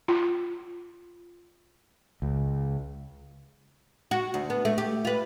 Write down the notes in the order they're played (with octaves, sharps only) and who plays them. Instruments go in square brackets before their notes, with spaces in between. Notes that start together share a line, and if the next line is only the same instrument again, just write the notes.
[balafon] F4
[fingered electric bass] C#2
[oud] F#4
D2
B3
A3
G4
F4 B4